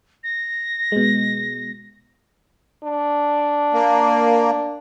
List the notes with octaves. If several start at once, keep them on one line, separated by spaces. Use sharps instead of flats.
A#6
B2 G#3
D4
A#3